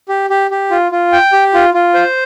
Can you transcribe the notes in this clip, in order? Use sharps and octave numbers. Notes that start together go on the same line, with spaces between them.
G4
G4
G4
F4
F4
G5
G4
F4
F4
C5